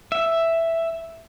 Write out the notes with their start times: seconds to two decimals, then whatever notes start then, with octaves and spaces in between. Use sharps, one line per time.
0.12 E5